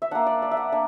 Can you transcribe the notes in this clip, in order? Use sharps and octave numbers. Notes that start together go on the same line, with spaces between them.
E5
A#3 D4 F#5
D5
D5
E5
F#5
A#3 D4